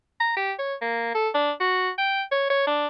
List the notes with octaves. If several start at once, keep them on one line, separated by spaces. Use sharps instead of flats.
A#5
G4
C#5
A#3
A4
D4
F#4
G5
C#5
C#5
D4